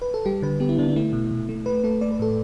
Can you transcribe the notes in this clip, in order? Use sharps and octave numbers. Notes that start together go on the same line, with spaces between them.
B4
A4
G3 G4
D3 B4
B3 G4
E4
D3 D4
D4
A3 E4
B2
B2
A3
A3 B4
A3 A4
A3 D5
B4
A2 A4